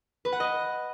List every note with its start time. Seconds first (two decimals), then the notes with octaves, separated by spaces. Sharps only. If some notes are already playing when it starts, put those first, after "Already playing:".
0.25 B4
0.32 F#5
0.40 D#5